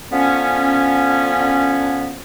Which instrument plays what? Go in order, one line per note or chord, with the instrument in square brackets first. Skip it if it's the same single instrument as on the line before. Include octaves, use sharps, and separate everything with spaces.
[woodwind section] D3 F3 B3 C#4